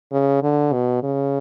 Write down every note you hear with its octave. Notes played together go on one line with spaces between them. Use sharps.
C#3
D3
B2
C#3